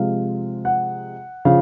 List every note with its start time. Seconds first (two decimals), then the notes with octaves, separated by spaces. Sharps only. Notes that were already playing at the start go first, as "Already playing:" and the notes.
Already playing: C3 F3 G#3 F5
0.65 F#5
1.45 C#3 F3 F5